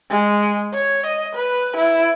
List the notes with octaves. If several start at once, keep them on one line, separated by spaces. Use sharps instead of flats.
G#3
C#5
D#5
B4
E4